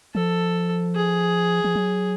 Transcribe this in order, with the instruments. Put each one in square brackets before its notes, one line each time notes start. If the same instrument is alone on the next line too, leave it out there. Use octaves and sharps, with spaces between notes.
[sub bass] F3 [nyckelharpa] A4
[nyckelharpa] G#4
[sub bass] F3
F#3